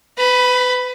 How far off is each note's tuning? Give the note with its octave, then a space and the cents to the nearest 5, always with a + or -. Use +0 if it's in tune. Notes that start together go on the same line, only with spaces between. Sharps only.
B4 +30 B5 +0